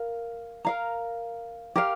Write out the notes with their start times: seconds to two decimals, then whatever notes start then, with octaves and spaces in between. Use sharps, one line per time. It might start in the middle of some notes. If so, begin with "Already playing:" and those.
Already playing: A#4 F5
0.65 A#4 F5 A#5
1.76 G4 A#4 F5